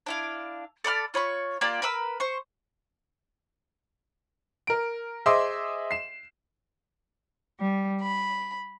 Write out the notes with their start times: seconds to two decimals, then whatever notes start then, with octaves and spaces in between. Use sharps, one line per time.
0.06 D4 E4 F5
0.84 A4 D5 B5 F6
1.14 F4 C#5 B5 C#6
1.61 A#3 F4 G4 D5
1.82 A#4 B4 B5 E6
2.20 C5 C#6
4.67 A#4 D7
5.26 G#4 C5 D#5 E5 C6 D6
5.91 C7 E7
7.60 G3
8.01 B5